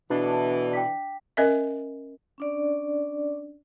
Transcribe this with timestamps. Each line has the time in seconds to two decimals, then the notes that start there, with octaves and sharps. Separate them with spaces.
0.10 B2 D3 E3 D4
0.73 G5 D6 B6
1.37 C#4 A#4 D#5 E5
2.38 C#4 D4 D5